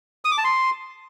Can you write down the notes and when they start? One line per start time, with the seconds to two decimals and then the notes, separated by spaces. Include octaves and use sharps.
0.25 D#6
0.31 D6
0.38 A5
0.44 C6